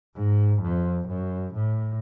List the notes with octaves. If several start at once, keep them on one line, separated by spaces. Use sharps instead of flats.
G#2
F2
F#2
A2